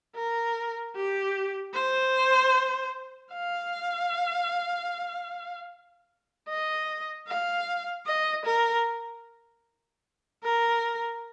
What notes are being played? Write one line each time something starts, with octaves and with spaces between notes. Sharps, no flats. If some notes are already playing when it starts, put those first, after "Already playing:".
A#4
G4
C5
F5
D#5
F5
D#5
A#4
A#4